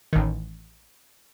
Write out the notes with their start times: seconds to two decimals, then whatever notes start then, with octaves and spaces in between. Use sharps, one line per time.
0.13 A1 D#3